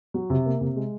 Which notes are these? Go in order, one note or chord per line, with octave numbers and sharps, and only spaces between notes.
F#3
C3
A#3
C3
G#3